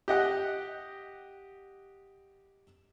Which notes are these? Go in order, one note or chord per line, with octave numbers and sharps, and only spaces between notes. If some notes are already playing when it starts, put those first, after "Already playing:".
G4 D#5 F#5 G5